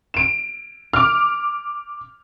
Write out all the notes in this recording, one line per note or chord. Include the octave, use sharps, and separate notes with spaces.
D7 E7
D6 F6